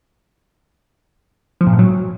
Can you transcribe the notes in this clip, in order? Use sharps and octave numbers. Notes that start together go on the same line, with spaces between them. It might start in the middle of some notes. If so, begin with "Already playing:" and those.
F3
A#2
A2
F#3